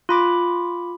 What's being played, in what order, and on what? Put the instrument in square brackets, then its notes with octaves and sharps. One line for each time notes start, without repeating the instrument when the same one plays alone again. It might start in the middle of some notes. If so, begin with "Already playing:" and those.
[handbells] F4 B5 D6